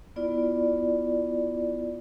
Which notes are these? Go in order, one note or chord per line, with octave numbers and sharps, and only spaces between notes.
B3 E4 F4 D5